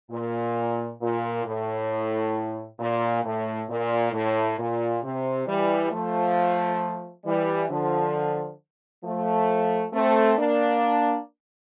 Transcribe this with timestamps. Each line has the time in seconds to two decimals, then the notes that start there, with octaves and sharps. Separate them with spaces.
0.11 A#2
1.01 A#2
1.45 A2
2.79 A#2
3.24 A2
3.69 A#2
4.12 A2
4.58 A#2
5.02 C3
5.47 E3 G3
5.91 F3 A3
7.25 E3 G3
7.70 D3 F3
9.04 F3 A3
9.93 A3 C4
10.37 A#3 D4